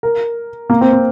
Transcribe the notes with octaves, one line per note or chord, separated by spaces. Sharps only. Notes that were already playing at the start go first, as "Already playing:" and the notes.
A#4
A#3
C4
C4